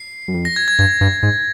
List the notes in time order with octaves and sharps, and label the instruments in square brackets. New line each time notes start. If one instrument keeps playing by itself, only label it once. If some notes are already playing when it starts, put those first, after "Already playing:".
Already playing: [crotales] C7
[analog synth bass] F#2
F2
[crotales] A#6
G#6
G#6
[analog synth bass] G2 [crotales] G#6
[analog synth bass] G2
G#2